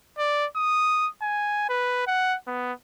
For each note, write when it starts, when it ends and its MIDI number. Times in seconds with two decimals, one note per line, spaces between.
0.18 0.46 74
0.56 1.08 87
1.22 1.65 80
1.69 2.05 71
2.07 2.36 78
2.47 2.73 59